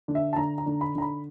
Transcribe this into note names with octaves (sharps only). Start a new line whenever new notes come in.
D3
E5
A5
D3 A#5
A#5
D3
B5
D3 A#5
B5